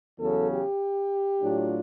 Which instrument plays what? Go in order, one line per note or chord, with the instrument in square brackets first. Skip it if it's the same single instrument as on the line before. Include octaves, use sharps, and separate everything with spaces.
[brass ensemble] E2 C#3 F#3 A4
G4
A2 F#3 A3 D4 F4